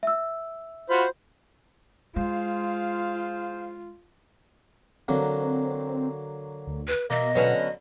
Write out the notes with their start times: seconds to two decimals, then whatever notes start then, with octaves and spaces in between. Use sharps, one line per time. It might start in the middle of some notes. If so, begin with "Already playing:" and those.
0.03 E5 E6
0.90 F4 F#4 C5 B5
2.16 G#3 F4 G#4 C5 F5
5.08 D3 F#3 A#3 C4
6.67 D2
6.88 B4
7.10 B2 A#3 D#5 E5
7.35 D3 F#3 B3 C#4